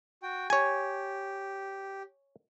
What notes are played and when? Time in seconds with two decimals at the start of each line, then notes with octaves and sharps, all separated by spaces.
0.23 F#4 G5
0.50 G4 C#5 G#5